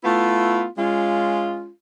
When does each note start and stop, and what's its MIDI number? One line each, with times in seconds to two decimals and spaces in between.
0.04 0.67 57
0.04 0.67 59
0.04 0.67 64
0.04 0.67 65
0.78 1.70 56
0.78 1.70 61
0.78 1.70 65